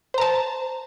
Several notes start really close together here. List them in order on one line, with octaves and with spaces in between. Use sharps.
C5 A#5 A5